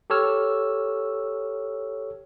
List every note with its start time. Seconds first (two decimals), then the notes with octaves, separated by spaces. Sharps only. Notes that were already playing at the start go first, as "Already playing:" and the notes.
0.10 G4 A4 C#5 E6 F6